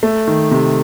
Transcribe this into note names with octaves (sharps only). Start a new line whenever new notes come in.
A3
D#3
C3